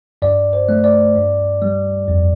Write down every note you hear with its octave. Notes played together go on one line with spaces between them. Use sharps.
G2 D5
C5
A3
D5
G2
G3
F2